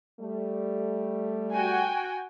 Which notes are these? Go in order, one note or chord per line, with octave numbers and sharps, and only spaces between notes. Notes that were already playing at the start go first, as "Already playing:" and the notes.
G3 A3
F#4 G5 G#5